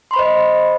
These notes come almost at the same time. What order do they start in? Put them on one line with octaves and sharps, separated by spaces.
C6 B5 C5 D#5